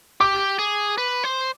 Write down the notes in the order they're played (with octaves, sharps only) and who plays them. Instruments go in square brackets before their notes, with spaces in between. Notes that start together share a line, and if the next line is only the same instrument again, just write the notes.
[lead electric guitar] G4 [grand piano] D6
[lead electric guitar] G#4
B4
C5